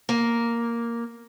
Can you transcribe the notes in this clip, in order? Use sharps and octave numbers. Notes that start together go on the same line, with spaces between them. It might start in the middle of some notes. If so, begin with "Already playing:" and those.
A#3